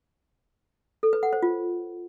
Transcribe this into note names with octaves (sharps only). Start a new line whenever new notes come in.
A4
B4
F#5
C5
F4